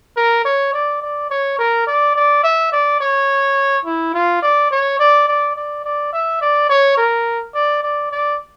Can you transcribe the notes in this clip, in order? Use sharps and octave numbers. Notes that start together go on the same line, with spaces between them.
A#4
C#5
D5
D5
C#5
A#4
D5
D5
E5
D5
C#5
E4
F4
D5
C#5
D5
D5
D5
D5
E5
D5
C#5
A#4
D5
D5
D5